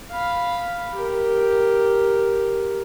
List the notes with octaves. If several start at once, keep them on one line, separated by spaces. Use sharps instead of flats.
F5 B5
G4 A#4